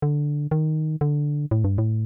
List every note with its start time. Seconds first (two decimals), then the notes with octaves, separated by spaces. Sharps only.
0.02 D3
0.51 D#3
1.01 D3
1.51 A2
1.64 G2
1.78 A2